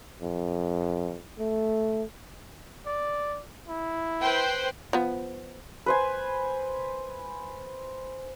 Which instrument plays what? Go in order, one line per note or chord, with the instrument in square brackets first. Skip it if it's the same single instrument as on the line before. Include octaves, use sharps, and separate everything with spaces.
[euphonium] F2
A3
[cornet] D5
E4
[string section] B4 C5 G5
[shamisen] F3 B3
[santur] B4 C5 G#5